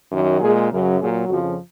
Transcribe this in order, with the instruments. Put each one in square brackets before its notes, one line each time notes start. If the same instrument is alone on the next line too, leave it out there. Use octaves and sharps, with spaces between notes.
[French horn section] F#2 D#3 F#3
A#2 G#3 G#4
F#2 C#3 F#3 A#4
A#2 F#3 G#4
F2 C#3 F3 F#4